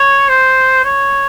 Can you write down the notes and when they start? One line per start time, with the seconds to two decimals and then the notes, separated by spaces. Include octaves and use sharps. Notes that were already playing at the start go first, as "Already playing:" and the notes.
Already playing: C#5
0.29 C5
0.84 C#5